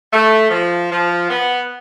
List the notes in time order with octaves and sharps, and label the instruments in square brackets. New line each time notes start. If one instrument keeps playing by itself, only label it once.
[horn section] A3
F3
F3
B3